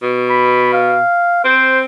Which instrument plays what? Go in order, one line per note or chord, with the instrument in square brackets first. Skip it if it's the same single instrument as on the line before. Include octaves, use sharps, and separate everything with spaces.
[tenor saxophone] B2
[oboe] B5
F5
[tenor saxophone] C4 [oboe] C5